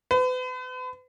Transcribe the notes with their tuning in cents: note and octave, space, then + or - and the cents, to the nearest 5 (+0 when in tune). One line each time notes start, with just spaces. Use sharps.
B4 +40